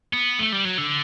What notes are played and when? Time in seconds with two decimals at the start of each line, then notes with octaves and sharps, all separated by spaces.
0.13 B3
0.39 A3
0.52 G3
0.65 F#3
0.78 D3